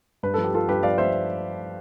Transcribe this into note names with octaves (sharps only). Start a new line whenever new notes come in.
G2 B4
F3 A4
G4
F3 F4 A4
G2 G4 B4
F3 D5 F5
F3 C5 E5